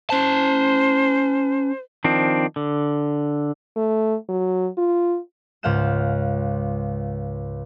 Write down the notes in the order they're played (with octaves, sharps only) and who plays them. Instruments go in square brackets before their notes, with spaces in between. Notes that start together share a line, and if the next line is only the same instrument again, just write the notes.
[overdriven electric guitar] C#4 A5 [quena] C5
[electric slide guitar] D#3 F3 C4 D4
D3
[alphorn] A3
F#3
F4
[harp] C#2 G#2 F5 F#5 G6 E7